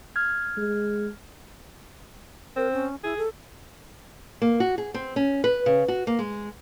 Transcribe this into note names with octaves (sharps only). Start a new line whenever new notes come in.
F6 G#6
G#3
C4 A#4
C#4
E4 G#4
A4
A#3
F#4
G#4
C4
C#4
B4
C#3
F#4
A#3
G#3